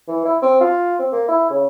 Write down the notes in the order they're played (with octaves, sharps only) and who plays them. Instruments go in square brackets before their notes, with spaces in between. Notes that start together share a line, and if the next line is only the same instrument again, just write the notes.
[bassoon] E3
E4
C4
F4
C4
A#3
E4
C#3